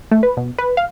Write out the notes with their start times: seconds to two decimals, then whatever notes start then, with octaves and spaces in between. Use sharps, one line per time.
0.11 A3
0.23 B4
0.37 B2
0.58 B4
0.77 F5